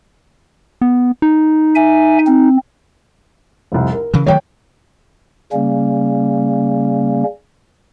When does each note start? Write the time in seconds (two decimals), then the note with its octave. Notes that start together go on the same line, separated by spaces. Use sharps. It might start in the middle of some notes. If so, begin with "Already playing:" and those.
0.82 B3
1.22 D#4
1.75 E5 G#5
2.27 C4
3.72 F1 C2
3.92 A#4
4.14 C#3 E3
4.26 D#3 F#3 A3 C#5 G5
5.53 C#3 G3 A#3 C#4